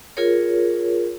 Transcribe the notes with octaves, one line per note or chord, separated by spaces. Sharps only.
F4 G#4 A#4 C#5